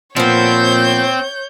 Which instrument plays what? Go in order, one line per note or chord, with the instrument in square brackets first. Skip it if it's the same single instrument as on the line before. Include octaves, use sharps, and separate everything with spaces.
[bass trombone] A#2 [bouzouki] F3 B3 [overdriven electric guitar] C4 [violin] C#5 G6